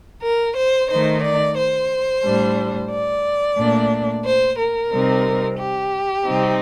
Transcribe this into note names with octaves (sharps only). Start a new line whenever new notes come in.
A#4
C5
D#3 A3 D#4 C5
D5
C5
A2 G3 D4
D5
A#2 A3 D4
C5
A#4
C3 G3 C4 D#4
G4
C3 G3 C4 D#4